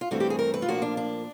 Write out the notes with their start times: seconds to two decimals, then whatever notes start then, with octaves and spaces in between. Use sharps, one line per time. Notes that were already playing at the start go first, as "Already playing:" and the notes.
0.01 F4
0.11 G2 E3 A3 C4 F#4
0.20 G4
0.30 G#4
0.39 A#4
0.54 B4
0.62 F4
0.68 A#2 F3 A#3 D4 F#4
0.82 D4
0.97 D4